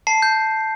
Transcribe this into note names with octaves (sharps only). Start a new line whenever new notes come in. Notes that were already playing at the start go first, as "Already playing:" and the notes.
A5 C7
G6